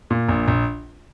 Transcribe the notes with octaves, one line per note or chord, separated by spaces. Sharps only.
A#2
A#1
A#1